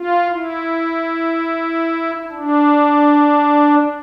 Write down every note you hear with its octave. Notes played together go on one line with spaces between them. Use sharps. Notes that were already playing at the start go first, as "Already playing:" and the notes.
Already playing: F4
E4
D4